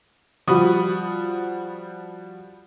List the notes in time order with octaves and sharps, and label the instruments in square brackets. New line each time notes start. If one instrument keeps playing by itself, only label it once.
[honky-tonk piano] F3 G3 F#4 B5 D#6